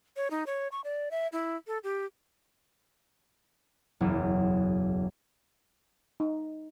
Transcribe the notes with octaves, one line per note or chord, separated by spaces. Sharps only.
C#5
D#4
C#5
C#6
D5
E5
E4
A4
G4
F#1 B1 E2
D#4